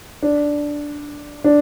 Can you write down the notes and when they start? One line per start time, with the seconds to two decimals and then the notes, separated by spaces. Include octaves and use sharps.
0.22 D4
1.44 D4